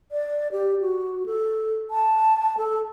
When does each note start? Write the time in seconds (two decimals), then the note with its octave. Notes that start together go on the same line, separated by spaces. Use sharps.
0.12 D5
0.52 G4
0.81 F#4
1.26 A4
1.91 A5
2.58 A4